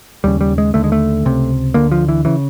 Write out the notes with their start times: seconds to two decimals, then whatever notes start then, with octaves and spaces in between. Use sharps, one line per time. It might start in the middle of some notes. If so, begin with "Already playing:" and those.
0.24 D#2 C#3 G3
0.41 G3
0.58 G#3
0.74 D#2 D3 A3
0.84 G#3
0.92 A3
1.25 C#2 C3
1.74 D2 D3 A#3
1.91 F3
2.09 E3
2.25 C#3 E3